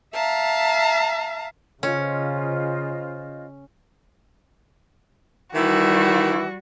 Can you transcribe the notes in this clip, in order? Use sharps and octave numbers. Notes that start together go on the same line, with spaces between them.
E5 F5 A5 A#5
C#3 C#4 F4 C5 D#5
D#3 E3 G3 E4 F#4